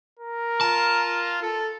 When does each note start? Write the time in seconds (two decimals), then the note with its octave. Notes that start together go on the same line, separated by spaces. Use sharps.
0.19 A#4
0.61 F4 A5
1.42 A4